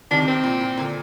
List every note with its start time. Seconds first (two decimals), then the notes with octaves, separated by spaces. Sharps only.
0.11 C3 D#3 D4
0.22 C3
0.28 C4
0.33 C3
0.44 A#2
0.61 A#2
0.77 A#2 D3